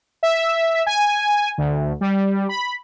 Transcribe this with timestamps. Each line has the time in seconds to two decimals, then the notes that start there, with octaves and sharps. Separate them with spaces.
0.23 E5
0.86 G#5
1.58 D2
2.01 G3
2.49 B5